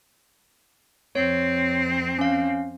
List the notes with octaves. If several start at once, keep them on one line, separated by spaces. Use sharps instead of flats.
F2 C4 C#5
C#4 F5